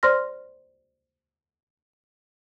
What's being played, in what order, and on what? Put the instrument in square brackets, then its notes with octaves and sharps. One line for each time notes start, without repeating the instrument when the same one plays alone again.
[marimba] C5 D5 C6 F6 A#6